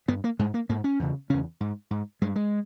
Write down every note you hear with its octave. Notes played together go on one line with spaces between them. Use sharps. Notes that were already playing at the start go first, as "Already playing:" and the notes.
G2 B3
A#3
G#2 G#3
A#3
G#2 A#3
C#4
E2 C#3
E2 C#3 C#4
G#2
G#2
G2 G#3
G#3